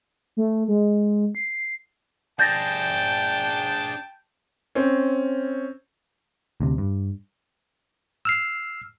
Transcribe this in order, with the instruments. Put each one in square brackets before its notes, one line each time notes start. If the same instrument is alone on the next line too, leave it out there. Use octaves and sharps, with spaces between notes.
[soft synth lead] A3
G#3
C7
[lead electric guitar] D4 G#4 [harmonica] G5 A5 [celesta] G6 A6 A#6
[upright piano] C4 C#4
[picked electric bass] D2 C3
G2
[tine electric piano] E6 F6 C7